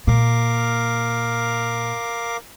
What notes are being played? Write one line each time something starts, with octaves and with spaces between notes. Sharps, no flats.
A#2 A#4 F5 D6